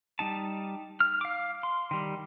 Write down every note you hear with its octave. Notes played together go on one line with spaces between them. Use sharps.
G3 D#4 A5
F6
F5 D6
C6
D#3 G3